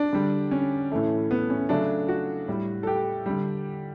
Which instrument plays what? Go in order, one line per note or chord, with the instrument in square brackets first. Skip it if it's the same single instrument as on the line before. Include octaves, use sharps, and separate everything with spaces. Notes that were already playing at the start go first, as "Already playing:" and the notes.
Already playing: [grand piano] D4
D3 G3
C#4
A2 E3 A3
B3
C#4
C#3 F#3 A3 D4
F#4
A2 G3
A4
G4
D3 G3